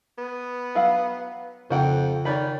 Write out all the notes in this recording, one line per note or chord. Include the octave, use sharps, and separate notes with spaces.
B3
F#3 F5 F#5
F2 C#3 C5 F#5 G5
D#3 C#5 D5 B5